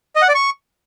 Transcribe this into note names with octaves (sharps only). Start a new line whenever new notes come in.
D#5
F#5
D5
C#6